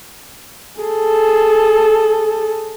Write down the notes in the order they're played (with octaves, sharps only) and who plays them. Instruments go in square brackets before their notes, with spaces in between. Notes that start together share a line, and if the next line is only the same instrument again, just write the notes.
[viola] G#4 A4